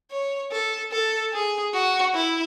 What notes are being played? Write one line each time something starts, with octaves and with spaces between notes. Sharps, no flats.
C#5
A4
A4
G#4
F#4
E4